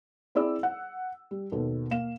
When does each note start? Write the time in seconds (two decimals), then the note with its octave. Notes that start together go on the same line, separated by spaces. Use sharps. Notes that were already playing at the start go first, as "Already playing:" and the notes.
0.35 C4 E4 G#4 D5 E6
0.63 F#5
1.31 G3
1.52 D#2 B2 A4
1.91 A#3 F5 E7